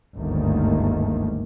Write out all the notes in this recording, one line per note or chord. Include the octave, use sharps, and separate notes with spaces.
G1 D2 G#2 D#3 A3 A#3